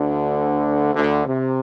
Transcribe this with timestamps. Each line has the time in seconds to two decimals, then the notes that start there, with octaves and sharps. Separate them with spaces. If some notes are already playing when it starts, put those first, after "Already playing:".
Already playing: D2 D3
0.95 D2 D3
1.26 C3